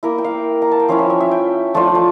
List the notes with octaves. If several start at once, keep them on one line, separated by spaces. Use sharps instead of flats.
A#3 E4 A#4
G5
F5
A#5
A5
G5
F3 C#4 E4 F5
E5
E5
E5
G5
F3 A3 D4 F4 A5
A5